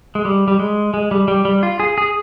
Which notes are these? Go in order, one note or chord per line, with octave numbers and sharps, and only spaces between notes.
G#3
G3
G3
G#3
G#3
G3
G3
G3
F4
G#4
G#4